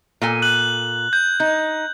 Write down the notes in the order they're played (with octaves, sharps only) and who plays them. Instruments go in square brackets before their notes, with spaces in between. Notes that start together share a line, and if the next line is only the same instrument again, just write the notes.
[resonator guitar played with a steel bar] A#2 A4 G#5
[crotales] F#6 F#7
G6
[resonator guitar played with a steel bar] D#4 [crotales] G6